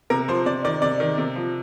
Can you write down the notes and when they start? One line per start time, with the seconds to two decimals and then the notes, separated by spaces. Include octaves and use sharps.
0.10 C3 A#4
0.28 F3 C5
0.46 C3 D5
0.64 D#3 D5
0.82 C3 D5
1.00 D#3
1.18 C3
1.36 F3